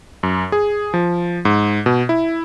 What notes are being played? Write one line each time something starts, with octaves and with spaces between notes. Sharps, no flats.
F#2
G#4
F3
G#2
B2
E4